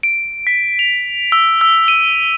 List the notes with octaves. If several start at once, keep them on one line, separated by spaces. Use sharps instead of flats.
D7
B6
F7
E6
E6
D#7